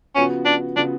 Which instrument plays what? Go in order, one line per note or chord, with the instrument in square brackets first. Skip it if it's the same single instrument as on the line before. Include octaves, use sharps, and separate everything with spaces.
[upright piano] C#3 F3 B3 F#4 [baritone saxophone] C#4
[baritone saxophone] D4
[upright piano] C#3 F3 B3 F#4 [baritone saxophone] D4